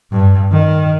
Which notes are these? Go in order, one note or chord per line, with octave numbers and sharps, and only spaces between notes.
G2
D#3